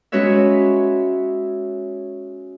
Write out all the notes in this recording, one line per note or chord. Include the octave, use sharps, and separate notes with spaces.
G#3 C#4 F#4 B4 C#5 E5